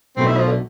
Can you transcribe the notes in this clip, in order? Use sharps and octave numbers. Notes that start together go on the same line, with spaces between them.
B1 B2 A3 C4
E4
F3
D3